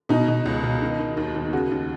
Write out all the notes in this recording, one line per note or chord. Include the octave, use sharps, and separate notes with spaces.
B2 D#4
B2
C#2
B2
D#3
D#3
D#2
D#2
C#3 F#4
D#2